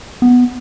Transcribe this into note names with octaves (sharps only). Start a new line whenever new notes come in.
B3